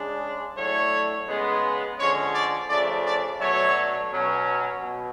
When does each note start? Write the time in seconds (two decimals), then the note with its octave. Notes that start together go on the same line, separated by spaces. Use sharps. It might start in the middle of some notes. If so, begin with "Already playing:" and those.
Already playing: C#3 G#3 D4
0.57 A2 F#3 A3 D4 C#5
1.28 C#3 G#3 B3
1.99 D3 F3 G#3 C#4 C#5
2.35 D5
2.69 C#3 F3 A3 D4 D5
3.05 D5
3.40 B2 F#3 A3 D4 C#5
4.10 B2 F#3 C#4
4.81 B2